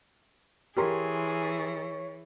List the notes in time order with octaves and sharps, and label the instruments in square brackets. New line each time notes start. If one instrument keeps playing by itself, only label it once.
[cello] E3 [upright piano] G4 A#4 C6 [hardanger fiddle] G#4 [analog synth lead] C#5